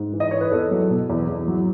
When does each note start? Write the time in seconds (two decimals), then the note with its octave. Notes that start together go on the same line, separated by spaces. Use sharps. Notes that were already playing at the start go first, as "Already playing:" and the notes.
Already playing: G#2
0.13 E3
0.20 D#5
0.31 E3 C#5
0.41 B4
0.51 E2 A4
0.71 F#3
0.90 B2
1.10 E2
1.28 E2
1.48 F#3